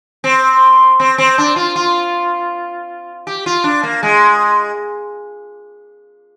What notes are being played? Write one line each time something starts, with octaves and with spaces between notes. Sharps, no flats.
C4
C4
C4
D4
F4
F4
G4
F4
D4
A#3
G#3